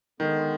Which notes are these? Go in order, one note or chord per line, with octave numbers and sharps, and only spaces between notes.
D3 D#3 G#3 B3